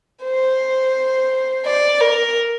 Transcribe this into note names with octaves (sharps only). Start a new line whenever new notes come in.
C5
D5
A#4